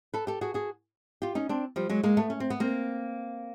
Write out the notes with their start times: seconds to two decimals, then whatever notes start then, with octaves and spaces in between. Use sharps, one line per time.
0.14 A4 B4
0.27 G4 A4
0.41 F#4 G#4
0.54 F#4 G#4
1.22 F4 G4
1.35 C#4 D#4
1.49 C4 D4
1.76 F3 G3
1.90 F#3 G#3
2.03 G#3 A#3
2.17 A3 B3
2.30 C#4
2.40 C4
2.50 B3
2.60 A#3 C4